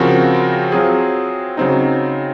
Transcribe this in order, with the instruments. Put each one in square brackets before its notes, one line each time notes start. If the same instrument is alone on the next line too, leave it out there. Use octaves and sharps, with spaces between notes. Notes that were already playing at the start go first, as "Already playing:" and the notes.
Already playing: [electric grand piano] C#3 F3 C4 F#4 A#4
F#3 C4 F4 G#4
C#3 F#3 C4 D#4